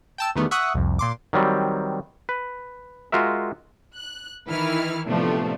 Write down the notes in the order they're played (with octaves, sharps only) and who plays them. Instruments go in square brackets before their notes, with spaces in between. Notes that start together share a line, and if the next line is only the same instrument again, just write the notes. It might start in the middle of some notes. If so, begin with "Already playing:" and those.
[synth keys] G5 A5 E6
E2 D#3 G3 A3 B3
E5 F#5 C#6 D#6 F#6
C2 F2
A#2 C6 D6
[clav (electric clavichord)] D#3 F#3 G3 C4
B4
G#3 F4 F#4 A#4 E5
[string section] F#6
D#3 E3 E4 B4 F6
A2 C3 F3 A3 B3 D4